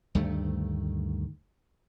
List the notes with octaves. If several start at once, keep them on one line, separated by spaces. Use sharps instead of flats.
D2 G2 D#3 A3